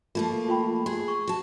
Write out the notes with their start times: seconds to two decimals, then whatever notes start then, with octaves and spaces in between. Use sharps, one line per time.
0.15 F3 A3 A#3 F4
0.48 F4 G5 B5
0.86 G#4 C6
1.08 C#6
1.28 F#4 A5